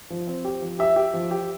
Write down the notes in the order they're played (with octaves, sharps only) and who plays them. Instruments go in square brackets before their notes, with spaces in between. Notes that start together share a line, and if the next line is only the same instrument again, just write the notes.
[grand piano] F3
C4
G4
F3
[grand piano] G4 [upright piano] E5
[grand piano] G4
F3
G4